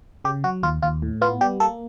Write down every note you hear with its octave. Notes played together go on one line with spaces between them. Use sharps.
C#3 G4
F#3 F#4
D#2 F4
D#2 F4
A2
B3 F4
G3 G4
A#3 A4